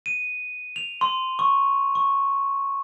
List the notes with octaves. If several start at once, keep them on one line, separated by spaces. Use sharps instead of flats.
D#7
F7
C6
C#6
C#6